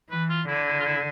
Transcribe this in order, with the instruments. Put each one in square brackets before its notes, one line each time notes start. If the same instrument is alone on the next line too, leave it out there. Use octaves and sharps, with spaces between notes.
[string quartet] E3 [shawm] B4
[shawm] F4
[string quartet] D3 [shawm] E4
[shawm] E4
F4
E4